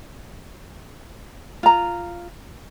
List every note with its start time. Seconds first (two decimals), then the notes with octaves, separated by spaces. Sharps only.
1.63 F4 A#5